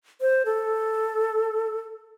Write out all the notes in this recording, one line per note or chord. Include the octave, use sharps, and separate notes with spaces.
C5
A4